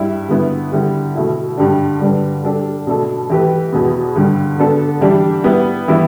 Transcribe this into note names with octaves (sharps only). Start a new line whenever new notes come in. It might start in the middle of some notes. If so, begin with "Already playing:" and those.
Already playing: G2 G3 E4
G2 D3 B3 E4
D3 G3 E4
B2 A3 E4
G2 D3 G3 D4 G4
G2 D3 G3 D4 B4
G3 D4 A4
B2 A3 D4 A4
E3 A3 G4 B4
E2 B2 B3
G2 D3 G3
D3 B3 D4 A4
E3 G3 D4 G4
G3 B3 E4
E3 G3 B3 E4